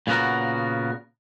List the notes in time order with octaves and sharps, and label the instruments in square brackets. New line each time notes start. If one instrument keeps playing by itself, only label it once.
[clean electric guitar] A#2 C#3 B3 F#4 A#4